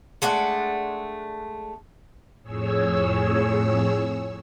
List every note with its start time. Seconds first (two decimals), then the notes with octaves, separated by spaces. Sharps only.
0.22 G#3 A3 D4 F#5
2.43 F2 A2 G#4 C#5 E6